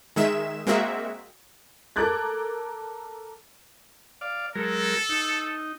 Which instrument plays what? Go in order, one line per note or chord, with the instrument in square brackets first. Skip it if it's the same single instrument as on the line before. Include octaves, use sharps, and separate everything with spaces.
[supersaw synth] D#3 G#3 E5 E7
G#3 A#3 C4 F#4 E5
[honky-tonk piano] A4 A#4 D6 F#6 G#6 A6
[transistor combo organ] D5 F5
[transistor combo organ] F#3 G#3 A#4 [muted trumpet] A4
[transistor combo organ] D#4